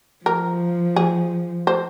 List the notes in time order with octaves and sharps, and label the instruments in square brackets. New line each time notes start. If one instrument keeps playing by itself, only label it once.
[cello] F3 [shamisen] A#4
[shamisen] G#4
C5